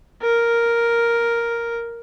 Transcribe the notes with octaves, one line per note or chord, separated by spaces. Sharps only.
A#4